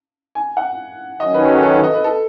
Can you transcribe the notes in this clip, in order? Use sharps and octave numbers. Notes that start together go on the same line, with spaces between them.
G#5
F#5
D#3 F#3 C#4 D#5
B4
A4
A4
B4
D#5
B4
A4